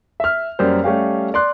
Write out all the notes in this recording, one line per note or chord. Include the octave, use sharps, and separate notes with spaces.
E5 F6
F#2 G3 A#3 C5
G3 A3 C#4 G4 F5
D5 C6 F#6